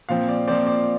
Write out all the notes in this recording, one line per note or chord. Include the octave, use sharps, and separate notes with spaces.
A#2 F3 C4 F5
D5
A#2 F3 C4 D5
D5